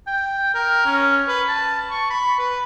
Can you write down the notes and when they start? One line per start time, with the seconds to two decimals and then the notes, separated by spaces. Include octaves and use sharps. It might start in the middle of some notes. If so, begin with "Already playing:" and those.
0.07 G5
0.54 A#4
0.86 C#4
1.28 B4
1.49 A5
1.91 C#6
2.10 B5
2.39 B4